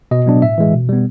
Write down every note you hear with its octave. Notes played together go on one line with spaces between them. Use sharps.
B2 D#5
F#3 B3 D4
A2 E5
E3 G#3
B2
G3 B3